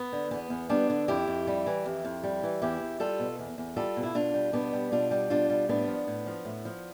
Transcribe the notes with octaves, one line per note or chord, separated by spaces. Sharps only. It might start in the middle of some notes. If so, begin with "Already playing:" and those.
Already playing: B3
D3
E2 B3
E2
G3 B3 D4
D3
F2 E4 G4
F2
G3
E3
F2
F2
G3
E3
E2 E4 G4
E2
G3 F4 A4
B2
E2
E2
G3 F4 A4
B2
E4
B2 D4 F4
G3
B2 B3 D4
G3
B2 D4 F4
G3
B2 D4 F4
G3
A2 B3 D4
F3
A2
F3
A2
F3